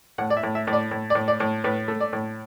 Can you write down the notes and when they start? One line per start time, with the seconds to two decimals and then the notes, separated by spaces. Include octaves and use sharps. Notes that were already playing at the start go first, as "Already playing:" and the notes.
0.18 A2 F#5
0.30 D5
0.37 E5
0.43 A2
0.55 E5
0.67 A2
0.73 D5
0.91 A2
1.10 D5
1.15 A2
1.28 D5
1.40 A2
1.64 A2 B4
1.88 A3
2.00 D5
2.13 A2